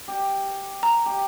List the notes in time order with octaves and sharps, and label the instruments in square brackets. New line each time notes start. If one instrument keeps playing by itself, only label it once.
[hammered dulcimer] G4
[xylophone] A#5
[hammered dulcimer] G4